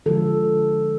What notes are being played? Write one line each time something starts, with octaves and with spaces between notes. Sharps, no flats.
D3 F3 G#3 A4